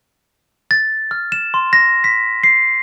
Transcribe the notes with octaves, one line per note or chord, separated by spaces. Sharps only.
A6
F6
E7
C6
A#6
B6
C7